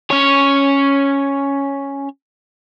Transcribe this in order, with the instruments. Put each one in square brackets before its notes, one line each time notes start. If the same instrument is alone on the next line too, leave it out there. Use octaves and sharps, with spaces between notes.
[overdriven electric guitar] C#4 C#5